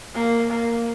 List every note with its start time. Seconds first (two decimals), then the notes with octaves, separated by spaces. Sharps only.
0.15 A#3
0.51 A#3